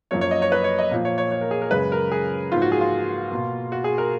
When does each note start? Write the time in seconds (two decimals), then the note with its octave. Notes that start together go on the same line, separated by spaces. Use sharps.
0.11 F#2 F3 A#3 C#5
0.21 C#5
0.31 D#5
0.42 C#5
0.52 B4
0.64 C#5
0.79 D#5
0.91 A#2 F3 A#3
1.05 C#5
1.18 C#5
1.31 C#5
1.41 A#4
1.51 G#4
1.62 A#4
1.71 F#2 C#3 G#3 B4
1.92 A#4
2.12 G#4
2.51 G#2 F3 A#3 F4
2.62 F#4
2.72 G#4
2.81 F4
3.32 B2 A#3
3.72 F#4
3.84 G#4
3.98 A#4